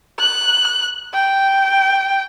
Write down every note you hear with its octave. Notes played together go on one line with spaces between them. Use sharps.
F#6
G5